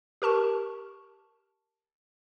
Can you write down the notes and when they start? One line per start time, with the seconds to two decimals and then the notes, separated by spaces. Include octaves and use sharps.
0.22 G4 A#4 A5 C#6